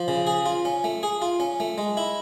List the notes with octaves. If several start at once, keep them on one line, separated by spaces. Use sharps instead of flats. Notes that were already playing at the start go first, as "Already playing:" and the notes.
Already playing: F3
C#3
G#4
F4
C#4
A3
G#4
F4
C#4
A3
G#3
E4